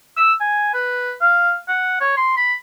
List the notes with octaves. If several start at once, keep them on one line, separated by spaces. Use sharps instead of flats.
E6
G#5
B4
F5
F#5
C#5
C6
B5